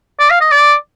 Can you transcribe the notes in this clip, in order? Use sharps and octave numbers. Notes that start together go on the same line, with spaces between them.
D5
F5
D#5
D5